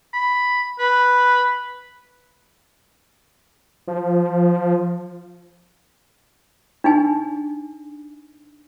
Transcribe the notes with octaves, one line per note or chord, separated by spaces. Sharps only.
B5
B4
F3
D4 D#4 G#5